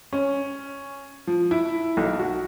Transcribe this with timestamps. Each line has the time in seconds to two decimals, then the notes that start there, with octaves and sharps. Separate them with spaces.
0.13 C#4
1.27 F3
1.51 E4
1.97 B1
2.19 F#4